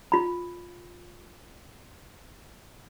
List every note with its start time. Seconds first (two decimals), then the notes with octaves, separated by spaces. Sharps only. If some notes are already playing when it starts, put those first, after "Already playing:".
0.12 F4 B5